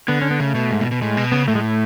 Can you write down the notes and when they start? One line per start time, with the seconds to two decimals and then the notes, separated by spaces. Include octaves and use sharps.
0.08 D3 B3
0.21 C#4
0.31 B3
0.40 C#3 A3
0.55 B2
0.71 G#2
0.81 B2
0.91 B2
1.02 A2 G#3
1.17 B2
1.32 C#3 B3
1.48 A2 A3
1.55 G#3
1.63 A3